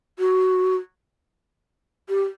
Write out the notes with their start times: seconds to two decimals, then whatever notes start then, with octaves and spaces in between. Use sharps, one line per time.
0.19 F#4
2.09 G4